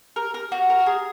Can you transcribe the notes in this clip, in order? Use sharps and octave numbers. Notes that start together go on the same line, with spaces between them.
A#4
A#4
F#4
A#4
G#4